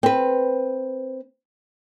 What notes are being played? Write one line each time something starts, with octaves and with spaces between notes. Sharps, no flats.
C4 B4